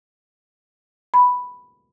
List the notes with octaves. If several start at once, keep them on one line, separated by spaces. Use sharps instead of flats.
B5